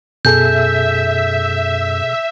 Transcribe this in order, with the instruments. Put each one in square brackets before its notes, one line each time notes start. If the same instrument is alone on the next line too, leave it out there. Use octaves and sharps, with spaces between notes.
[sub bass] F#2 [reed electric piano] B2 G#4 A4 [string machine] E5 [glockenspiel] G6